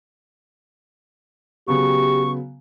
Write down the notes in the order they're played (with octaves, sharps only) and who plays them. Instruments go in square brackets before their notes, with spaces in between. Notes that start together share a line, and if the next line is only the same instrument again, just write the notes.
[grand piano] C#3 F#3 B3 [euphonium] G4 [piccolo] C#6